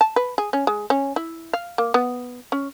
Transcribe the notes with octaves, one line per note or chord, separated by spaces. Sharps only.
A5
B4
G#4
C#4
G#3
C#4
E4
F5
A#3
B3
C#4